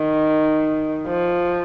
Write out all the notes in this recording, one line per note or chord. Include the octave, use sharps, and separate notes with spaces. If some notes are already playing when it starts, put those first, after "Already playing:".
Already playing: D#3
F3